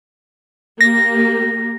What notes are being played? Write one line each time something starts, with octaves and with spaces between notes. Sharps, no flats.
A#3 G4 A#6